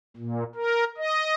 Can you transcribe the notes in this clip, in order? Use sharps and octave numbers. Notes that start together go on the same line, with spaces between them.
A#2
A#4
D#5